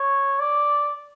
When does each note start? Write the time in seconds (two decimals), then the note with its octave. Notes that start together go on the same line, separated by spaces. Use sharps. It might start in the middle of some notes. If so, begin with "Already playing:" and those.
Already playing: C#5
0.40 D5